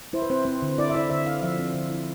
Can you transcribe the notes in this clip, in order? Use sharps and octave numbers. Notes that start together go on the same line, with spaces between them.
E4 C5
B4
C4 C5
C4
D3
E4 D5
E5
E4 D5
D3 E5
E4 F5
F3 E5
C4
D3
E4